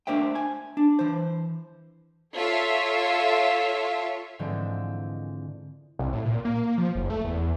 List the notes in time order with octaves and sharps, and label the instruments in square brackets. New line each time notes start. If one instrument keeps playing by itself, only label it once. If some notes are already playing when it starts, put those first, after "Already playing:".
[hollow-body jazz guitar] A3 D4 A#4 C5 E5 G5
G#5
D4
E3 C5
[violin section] F4 A4 C#5 E5
[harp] G#2 D3 E3 F3 G#3 C4
[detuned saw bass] C2
A2
A#2
A#3
F3
F#1
A3
E2